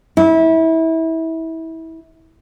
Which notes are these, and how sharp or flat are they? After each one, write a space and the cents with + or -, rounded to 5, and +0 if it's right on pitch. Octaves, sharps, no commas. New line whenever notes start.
E4 -25